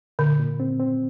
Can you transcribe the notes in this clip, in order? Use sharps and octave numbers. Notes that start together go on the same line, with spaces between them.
A#2 D3
A#2
C4
C4